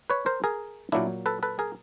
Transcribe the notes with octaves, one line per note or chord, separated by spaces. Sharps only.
B4 C#5
A#4 C5
G#4 A#4
A#2 F#3 A#3 D4 E4
A4 B4
A4 B4
G#4 A#4